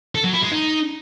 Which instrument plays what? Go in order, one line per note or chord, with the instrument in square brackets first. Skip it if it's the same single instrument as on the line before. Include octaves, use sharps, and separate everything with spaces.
[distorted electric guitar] A4
F#3
E4
G#3
D#4